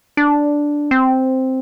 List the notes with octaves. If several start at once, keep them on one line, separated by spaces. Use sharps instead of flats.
D4
C4